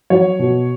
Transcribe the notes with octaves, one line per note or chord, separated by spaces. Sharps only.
F#3 C#5
B2